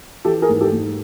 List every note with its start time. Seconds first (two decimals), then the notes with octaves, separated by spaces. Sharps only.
0.25 E3 G4 A4
0.42 G#4 A#4
0.49 G#2
0.61 G4 A4
0.73 G#2